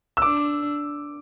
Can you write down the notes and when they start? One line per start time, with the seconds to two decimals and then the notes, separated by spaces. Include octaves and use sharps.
0.17 E6
0.22 D4 D6